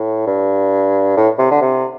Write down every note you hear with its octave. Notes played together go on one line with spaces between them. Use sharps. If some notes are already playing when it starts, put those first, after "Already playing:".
Already playing: A2
G2
A2
C3
D3
C3